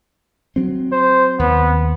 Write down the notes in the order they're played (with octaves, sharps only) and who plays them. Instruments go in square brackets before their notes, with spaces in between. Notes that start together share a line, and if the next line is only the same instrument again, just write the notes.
[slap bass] F#3 C4
[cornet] C5
[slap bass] D#2 [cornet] B3